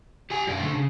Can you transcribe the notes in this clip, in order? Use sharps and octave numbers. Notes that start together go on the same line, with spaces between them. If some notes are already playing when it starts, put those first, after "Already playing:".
G4 G#5
F#2 D5
D3 A3
C#3